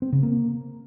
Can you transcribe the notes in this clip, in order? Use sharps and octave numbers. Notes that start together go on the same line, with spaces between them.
C4
C#3
A#3